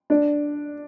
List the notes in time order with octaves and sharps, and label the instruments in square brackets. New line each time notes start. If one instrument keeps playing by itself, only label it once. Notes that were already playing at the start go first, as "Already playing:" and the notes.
[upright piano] D4